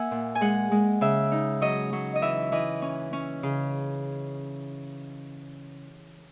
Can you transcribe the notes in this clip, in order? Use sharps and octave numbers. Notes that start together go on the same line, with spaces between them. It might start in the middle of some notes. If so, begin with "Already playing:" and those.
Already playing: A#3 E5 F#5 G#5
A#2
G#5
G#3 F#5
G#3
C#3 E5
D#4
F#3 D#5
F#3
D#5
E3 E5
E3 D#5
C#4
C#4
C#3